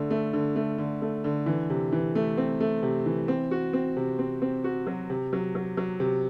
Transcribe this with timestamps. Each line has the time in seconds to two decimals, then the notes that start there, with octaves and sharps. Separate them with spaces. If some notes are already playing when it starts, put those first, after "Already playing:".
Already playing: D3 A3
0.10 A3
0.33 D3
0.56 A3
0.78 D3
1.02 A3
1.24 D3
1.46 E3
1.70 C3
1.93 E3
2.15 A3
2.37 C4
2.60 A3
2.83 C3
3.06 E3
3.28 C4
3.51 F#4
3.73 C4
3.96 C3
4.19 C4
4.42 C4
4.64 F#4
4.87 F#3
5.10 C3
5.33 F#3
5.55 F#3
5.77 F#3
6.00 C3